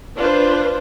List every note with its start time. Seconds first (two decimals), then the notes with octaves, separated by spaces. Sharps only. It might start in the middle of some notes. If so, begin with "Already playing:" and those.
0.17 D4 F4 B4 C5